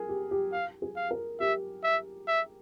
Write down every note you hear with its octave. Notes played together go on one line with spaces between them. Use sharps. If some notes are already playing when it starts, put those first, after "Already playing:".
Already playing: G#4 A#4
G4
G4
F5
G#4
F5
A#4
G4 E5
E5
E5